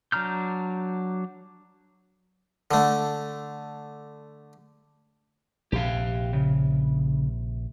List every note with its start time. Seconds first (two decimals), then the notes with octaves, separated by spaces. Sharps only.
0.12 F#3 D4 A#5 F6 G6
2.71 D3 A3
5.72 A#1 C3 G4 F5
6.33 C#3